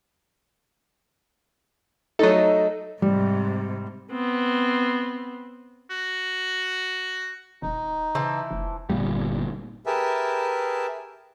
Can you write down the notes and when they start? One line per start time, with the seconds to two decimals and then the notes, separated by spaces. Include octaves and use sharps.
2.19 F#3 A3 D#4 A4 D#5
3.02 G#2 C3 G3
4.12 B3 C4
5.90 F#4
7.62 D#1 D#4
8.15 C#3 E3 C4 A5
8.51 F1
8.90 G1 C2 A#2 G3
9.86 G4 G#4 A#4 B4 E5 A5